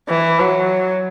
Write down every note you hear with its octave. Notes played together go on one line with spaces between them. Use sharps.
E3
F#3